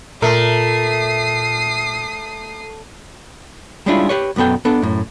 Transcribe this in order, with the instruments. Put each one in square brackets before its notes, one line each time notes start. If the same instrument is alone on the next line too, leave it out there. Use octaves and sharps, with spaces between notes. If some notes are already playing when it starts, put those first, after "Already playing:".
[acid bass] A#2 [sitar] A3 [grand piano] A#4 [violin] D#6 C7
[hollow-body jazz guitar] G3 G#3 C#4 D4 E4 F4
G4 B4 C#5
B1 F#2 B3 A4 G5
B3 D4 A4
F#2 A2